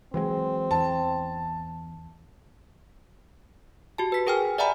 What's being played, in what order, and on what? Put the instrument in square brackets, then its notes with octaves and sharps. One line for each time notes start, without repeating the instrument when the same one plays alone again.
[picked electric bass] E3 F#3 G#3 [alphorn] C4
[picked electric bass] E2 [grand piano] A5
[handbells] F#4 G4 A5
B4 B6
G#4 A#4 G5 G#5 F6
D5 E5 F#5 G#5 A#5 B5